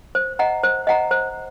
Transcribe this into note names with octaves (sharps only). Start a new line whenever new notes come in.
C5
D#5 F#5 A#5
C5
D#5 F#5 A#5
C5